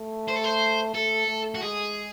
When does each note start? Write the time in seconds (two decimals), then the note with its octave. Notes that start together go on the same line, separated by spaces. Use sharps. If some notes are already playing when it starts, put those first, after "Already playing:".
Already playing: A3
0.28 C5
0.36 A4
0.44 C5
0.95 A3 A4
1.28 A3
1.55 F#4
1.62 G#3 G#4